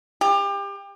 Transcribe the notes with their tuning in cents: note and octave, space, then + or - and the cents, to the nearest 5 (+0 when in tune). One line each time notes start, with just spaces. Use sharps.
G4 +30